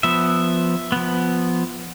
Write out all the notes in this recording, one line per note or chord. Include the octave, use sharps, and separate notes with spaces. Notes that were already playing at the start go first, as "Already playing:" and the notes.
F3 B3 E5
F3 B3